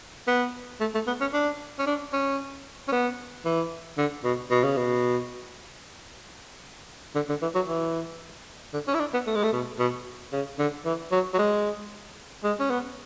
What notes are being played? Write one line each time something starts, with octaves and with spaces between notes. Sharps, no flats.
B3
A3
A3
B3
C#4
D4
C#4
D4
C#4
C#4
B3
E3
D3
B2
B2
C#3
B2
D3
D3
E3
F#3
E3
D3
C#4
E4
D4
B3
A3
G#3
A3
B2
B2
C#3
D3
E3
F#3
F#3
G#3
G#3
C#4
B3